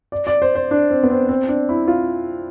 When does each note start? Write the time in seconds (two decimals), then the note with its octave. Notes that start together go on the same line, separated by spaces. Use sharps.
0.12 D5
0.27 D5
0.42 C5
0.55 C5
0.71 D4
0.91 C4
1.03 B3
1.10 C4
1.29 C4
1.48 D4
1.69 E4
1.88 F4